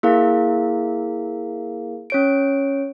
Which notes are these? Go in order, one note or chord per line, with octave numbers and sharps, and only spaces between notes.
A#3 E4 G#4 A#4 F5
C#4 C#5 D7